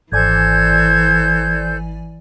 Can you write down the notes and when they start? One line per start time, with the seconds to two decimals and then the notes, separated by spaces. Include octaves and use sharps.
0.12 G#1 E3 A4 C5 D5 G#5 G6 G#6